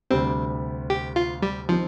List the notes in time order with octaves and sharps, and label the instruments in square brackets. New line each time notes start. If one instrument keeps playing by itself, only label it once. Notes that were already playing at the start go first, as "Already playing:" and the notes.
[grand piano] D2 C3 G3 [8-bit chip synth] C4
[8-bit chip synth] G4
F4
G3
[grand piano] D#3 G3 C4 [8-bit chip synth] F3